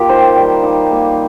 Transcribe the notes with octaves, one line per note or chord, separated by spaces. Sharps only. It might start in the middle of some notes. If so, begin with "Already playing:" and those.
Already playing: A#3 D#4 F4 G4 A#4
D#3 C5
G3
D#4
A#3